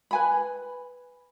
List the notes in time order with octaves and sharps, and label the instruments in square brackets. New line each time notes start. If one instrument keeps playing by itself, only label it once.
[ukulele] B4 G#5 B5